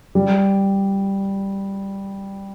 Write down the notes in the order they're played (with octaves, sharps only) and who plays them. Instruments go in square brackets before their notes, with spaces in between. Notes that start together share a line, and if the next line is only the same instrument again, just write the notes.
[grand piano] G3